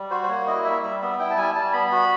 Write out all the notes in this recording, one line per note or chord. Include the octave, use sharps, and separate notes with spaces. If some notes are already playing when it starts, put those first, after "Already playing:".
Already playing: G3
F#4 C5
C5
A#3 C#5
E4 D#5
G3 E5
G3 E5
B3 E5
E4 G5
A5
G3 G#5
G3 A5
B3 B5
F#4